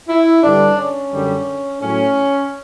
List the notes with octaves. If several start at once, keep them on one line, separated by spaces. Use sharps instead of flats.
E4
G2 D3 G3 D4
C#4
F#2 D3 G3
A2 F#3 C#4